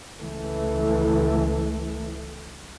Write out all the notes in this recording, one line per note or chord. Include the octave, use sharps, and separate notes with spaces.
C#2 E3 A3